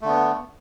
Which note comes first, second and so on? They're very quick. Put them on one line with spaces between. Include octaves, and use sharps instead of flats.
A3 D3 B3